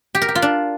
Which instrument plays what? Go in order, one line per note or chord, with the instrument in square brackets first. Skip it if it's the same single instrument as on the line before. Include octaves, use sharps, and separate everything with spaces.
[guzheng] G4
A#4
G4
F4
D4